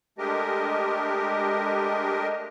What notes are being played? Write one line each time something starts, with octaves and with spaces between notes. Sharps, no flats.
G#3 A3 D4 G4 A#4 D#5